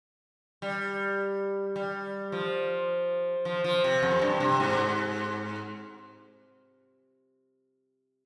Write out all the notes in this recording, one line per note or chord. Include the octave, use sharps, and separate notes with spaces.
G3
G3
F3
F3
F3
C3
F2
G2
C3
G#2